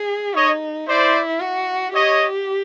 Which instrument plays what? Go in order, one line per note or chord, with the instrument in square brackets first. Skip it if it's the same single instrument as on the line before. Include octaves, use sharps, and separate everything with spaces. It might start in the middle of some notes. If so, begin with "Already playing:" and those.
Already playing: [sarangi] G#4
[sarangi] D#4 [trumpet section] C#5 D#5
[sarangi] E4 [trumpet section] C5 D5
[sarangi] F#4
[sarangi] G4 [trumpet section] C#5 D#5